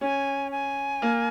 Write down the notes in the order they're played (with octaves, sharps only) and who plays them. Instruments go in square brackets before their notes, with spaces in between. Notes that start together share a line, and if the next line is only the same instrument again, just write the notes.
[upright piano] C#4 [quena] G#5
[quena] G#5
[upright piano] A#3